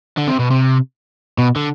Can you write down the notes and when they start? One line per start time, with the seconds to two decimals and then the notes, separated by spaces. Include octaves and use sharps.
0.17 D3
0.28 C3
0.39 B2
0.51 C3
1.38 B2
1.56 D3